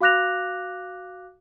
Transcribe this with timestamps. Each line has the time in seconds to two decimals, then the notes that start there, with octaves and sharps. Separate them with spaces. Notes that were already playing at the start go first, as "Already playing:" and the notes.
0.01 F#4 F5 D6 F#6 A#6 F7